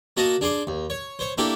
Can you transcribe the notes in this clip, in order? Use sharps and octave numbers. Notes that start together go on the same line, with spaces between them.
A#3 F#4 D#5 A5 A#5 D#6
D4 G#4 C6 D6
D#2
C#5
C5 C#5
A#3 D4 E4 G4 A4